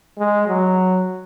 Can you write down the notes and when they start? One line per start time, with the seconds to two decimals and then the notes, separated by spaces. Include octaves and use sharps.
0.18 G#3
0.48 F#3